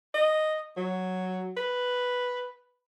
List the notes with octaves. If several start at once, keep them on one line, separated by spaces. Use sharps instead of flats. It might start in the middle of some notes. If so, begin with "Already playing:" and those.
D#5
F#3
B4